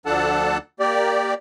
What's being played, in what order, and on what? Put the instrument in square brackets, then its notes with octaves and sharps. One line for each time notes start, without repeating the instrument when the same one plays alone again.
[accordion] D2 F3 D4 A4 F#5 A5
A#3 G4 D5